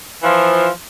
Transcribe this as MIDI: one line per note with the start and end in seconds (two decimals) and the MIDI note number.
0.23 0.67 52
0.23 0.67 53